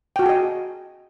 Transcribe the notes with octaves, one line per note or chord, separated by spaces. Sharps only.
F#4 G#4 D#5 G5 A5